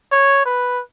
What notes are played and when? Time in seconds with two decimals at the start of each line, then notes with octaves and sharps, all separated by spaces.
0.12 C#5
0.45 B4